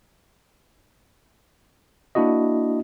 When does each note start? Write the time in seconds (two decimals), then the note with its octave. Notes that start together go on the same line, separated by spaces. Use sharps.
2.15 A#3 D4 E4 F#4 D#5